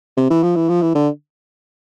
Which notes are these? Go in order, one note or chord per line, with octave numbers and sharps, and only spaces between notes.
C3
E3
F3
E3
F3
E3
D3